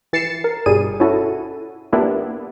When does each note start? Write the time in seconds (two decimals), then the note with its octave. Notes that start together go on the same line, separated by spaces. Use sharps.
0.13 E3 A6 C7 C#7 E7
0.44 A#4
0.66 G1 G2 B2 G3 G#4 D#7
1.00 C#4 E4 F#4 A4
1.92 A#3 B3 D4 E4 F4 G4